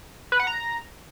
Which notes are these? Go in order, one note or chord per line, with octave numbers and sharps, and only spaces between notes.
B4
F#5
A#5